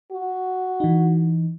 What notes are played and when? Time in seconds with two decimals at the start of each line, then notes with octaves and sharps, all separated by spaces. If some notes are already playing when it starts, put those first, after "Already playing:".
0.12 F#4
0.80 E3 D#4